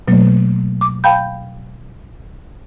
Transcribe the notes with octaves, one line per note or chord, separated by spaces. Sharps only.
B2 F#3 A3 A#3
D6
F5 G5 A5 B5 G6